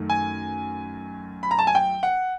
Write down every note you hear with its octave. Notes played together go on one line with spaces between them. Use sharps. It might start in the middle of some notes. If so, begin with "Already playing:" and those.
Already playing: F#2 D#3 A3
G#5
B5
A#5
A5
G#5
G5
F#5